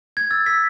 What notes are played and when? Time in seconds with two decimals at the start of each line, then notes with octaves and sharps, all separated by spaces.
0.17 G#6
0.31 E6 A6
0.46 E6 B6